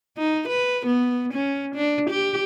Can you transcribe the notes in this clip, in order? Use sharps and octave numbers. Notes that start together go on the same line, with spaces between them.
D#4
B4
B3
C#4
D4
G4